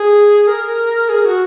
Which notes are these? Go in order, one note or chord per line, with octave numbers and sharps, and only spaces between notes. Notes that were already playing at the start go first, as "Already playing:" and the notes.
Already playing: G#4
A#4
G#4
F#4